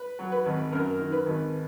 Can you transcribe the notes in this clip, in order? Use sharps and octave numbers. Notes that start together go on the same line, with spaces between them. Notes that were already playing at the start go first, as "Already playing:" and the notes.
Already playing: B4
F#3
B4
G#1
F#2 A#4
D#3
B4
G#1